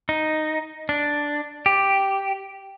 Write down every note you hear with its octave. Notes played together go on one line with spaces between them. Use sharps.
D#4
D4
G4